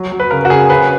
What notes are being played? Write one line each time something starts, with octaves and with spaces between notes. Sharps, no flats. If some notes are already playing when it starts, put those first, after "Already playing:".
Already playing: F#3
F#3
B4
C#3 A#4
F#4
C#3 G#4
C#3 B4